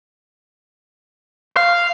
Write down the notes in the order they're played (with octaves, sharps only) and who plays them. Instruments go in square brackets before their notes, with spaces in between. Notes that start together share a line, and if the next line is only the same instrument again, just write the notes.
[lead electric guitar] F5